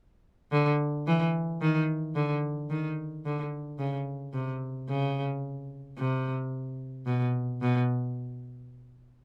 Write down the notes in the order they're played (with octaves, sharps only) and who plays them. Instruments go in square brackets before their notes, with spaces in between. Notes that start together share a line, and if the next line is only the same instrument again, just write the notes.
[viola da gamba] D3
E3
D#3
D3
D#3
D3
C#3
C3
C#3
C3
B2
B2